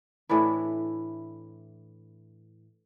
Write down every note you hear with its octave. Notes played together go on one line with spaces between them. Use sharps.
A2 E3 D4 E4